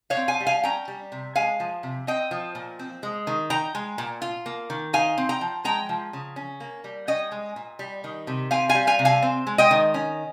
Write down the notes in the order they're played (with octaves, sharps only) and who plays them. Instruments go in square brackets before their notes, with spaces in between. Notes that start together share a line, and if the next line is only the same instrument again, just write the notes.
[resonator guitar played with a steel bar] C#5 F5
C4
F5 G#5
G3
F5 G#5
C#4 G5 A#5
G3
C3
G#3 F5 G#5
F3
C3
C4 D#5 G5
F3
A#2
C4
G#3
D#3
D#4 G5 A#5
G#3
A#2
F4
A#3
D#3
D#4 F5 G#5
C4
G5 A#5
F3
G#3 G5 A#5
F3
C#3
C#4
A#3
G3
C#4 D#5 G5
G#3
A#2
G3
D#3
C3
C4 F5 G#5
F5 G#5
G3
F5 G#5
C3
F5 G#5
C4
G#3
D#5 G5
D#3
C#4